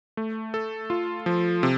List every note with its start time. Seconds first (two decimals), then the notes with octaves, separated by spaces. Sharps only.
0.17 A3
0.54 A4
0.90 F4
1.26 F3
1.63 C3